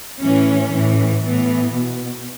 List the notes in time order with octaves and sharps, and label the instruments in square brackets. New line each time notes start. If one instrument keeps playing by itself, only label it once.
[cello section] A2 E3 C#4
A2 E3
A2 E3 B3
B2